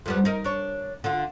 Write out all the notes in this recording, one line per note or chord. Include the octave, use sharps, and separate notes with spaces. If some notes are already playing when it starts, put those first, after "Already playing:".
F2 G3 B3
D#4 A#4
D4 C#5
D3 F4